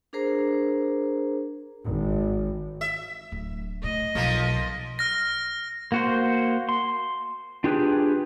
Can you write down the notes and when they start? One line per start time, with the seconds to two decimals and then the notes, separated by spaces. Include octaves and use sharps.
0.13 D4 G#4 A#4 C5 A#5
1.81 G#1
2.81 E5
3.32 D1
3.84 A2 D#5
4.15 B1 F3 A#3
4.99 F6 A#6
5.92 A#3 F#4 C5
6.69 C6
7.64 D4 F4 G4 G#4 B4